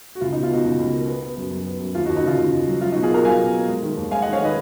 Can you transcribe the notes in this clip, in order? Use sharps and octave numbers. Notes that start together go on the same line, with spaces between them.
F#4
C#2 F4
D#4
B2
F4
B2 D#4 F#4
C#2 D#4
C#2
A#3
B3
B3
F#2
F#2
B3
F#2
D#2 F4
D#4 F#4
D#2
D#4 F#4
C#3 F4
C#3 D#4
D#2
F#3
F#3 F4
D#4 F#4
B2
F4 G#4
A#3 F#4 A#4
F#3 F5 G#5
B2
A#3
G#3
D#3
D#2
G#3 F5 G#5
D#5 F#5
D#3
C#5 F5
D#3 B4 D#5